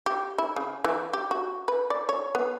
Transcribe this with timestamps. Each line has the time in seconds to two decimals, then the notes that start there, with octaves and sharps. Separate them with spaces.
0.06 G4
0.38 E4
0.56 C#3
0.84 E3
1.13 G4
1.31 F#4
1.68 B4
1.90 D5
2.09 C#5
2.35 B3